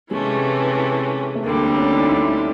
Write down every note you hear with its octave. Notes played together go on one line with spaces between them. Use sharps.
C3 E3 G#3 A3 C#4
A3
D2 D3 G3 A#3
C4
C#4
D#4
E4